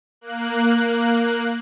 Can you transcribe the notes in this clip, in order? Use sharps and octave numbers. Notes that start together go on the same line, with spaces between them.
A#3 F#6